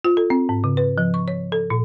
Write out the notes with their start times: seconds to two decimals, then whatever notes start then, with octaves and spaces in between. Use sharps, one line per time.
0.04 F4
0.17 A4
0.30 C4
0.49 G#2
0.64 C#3
0.77 B4
0.98 F3
1.14 C#6
1.28 C#5
1.52 A4
1.70 A#2